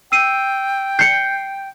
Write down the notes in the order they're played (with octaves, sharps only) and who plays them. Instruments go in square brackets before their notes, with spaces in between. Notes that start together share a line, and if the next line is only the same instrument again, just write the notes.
[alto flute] G5 [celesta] E6 C7 D#7
[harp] G6 C#7 [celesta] C7